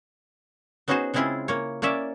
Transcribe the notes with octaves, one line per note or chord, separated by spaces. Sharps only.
B3 C#4 D#4 F#4 G#4 C5
C#3 G#3 C4 E4 F4 G#4
A#3 C#5
A#3 C#4 C#5 D5 E5